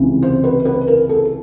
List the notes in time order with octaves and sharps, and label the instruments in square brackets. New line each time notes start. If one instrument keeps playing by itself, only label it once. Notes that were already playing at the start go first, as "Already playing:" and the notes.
Already playing: [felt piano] C#2 C3 E3
C5
B4
B4
A#4
A4